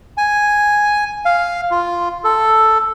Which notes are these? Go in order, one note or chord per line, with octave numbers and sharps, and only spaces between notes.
G#5
F5
F4
A4